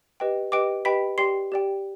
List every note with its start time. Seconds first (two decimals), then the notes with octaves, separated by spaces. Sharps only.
0.20 G4 B4 D#5 G5
0.52 G4 B4 D#5 G5 D6 D7
0.85 G4 B4 D#5 G5 B5 B6
1.18 G4 D5 G5 C6 C7
1.52 G4 D5 G5